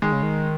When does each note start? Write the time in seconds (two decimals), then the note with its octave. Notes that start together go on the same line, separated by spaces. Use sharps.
0.02 D#3 G#3
0.12 C#3
0.23 D#3